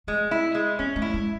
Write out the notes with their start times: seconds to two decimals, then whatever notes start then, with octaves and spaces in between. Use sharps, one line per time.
0.07 G#3 A3
0.31 E4
0.55 G#3
0.79 B3 C#4
0.96 A3
1.02 E4
1.14 G#3